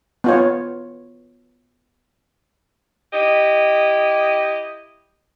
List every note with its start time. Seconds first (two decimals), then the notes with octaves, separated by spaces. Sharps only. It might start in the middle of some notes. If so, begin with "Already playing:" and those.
0.24 B3 F4 C#5
3.12 E4 G4 D#5